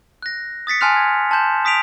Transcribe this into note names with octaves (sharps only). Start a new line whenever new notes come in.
F#6 A#6
D#6 A6 B6 C#7
G#5 A5 C6 F6 F#6 F7
G#6
A5 C6 G6 E7
D#6 B6 D7 F7